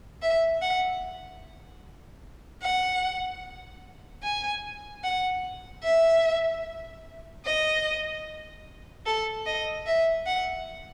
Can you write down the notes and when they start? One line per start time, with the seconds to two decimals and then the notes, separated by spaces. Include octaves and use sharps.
0.22 E5
0.62 F#5
2.62 F#5
4.23 G#5
5.04 F#5
5.84 E5
7.46 D#5
9.06 A4
9.46 D#5
9.86 E5
10.26 F#5